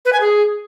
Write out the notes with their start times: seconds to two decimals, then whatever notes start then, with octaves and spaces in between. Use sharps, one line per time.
0.05 B4
0.13 G#5
0.21 G#4